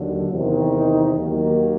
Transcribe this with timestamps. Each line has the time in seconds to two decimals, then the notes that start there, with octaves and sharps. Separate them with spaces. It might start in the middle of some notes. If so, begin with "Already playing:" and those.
Already playing: D#2 D3 F#3
0.30 E2 C3 D#3
0.73 D#4
1.16 D#2 D#3 F#3 A#3